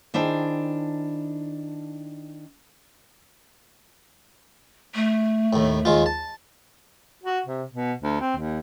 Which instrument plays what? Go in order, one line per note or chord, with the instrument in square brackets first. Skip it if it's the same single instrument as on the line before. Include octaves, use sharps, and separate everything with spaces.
[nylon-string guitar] D#3 D4 E4 G#4 C5 G5
[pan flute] A3
[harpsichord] D#2 A2
D#2 G#3 F4
A5
[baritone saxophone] F#4
C3
B2
D2
C4
D#2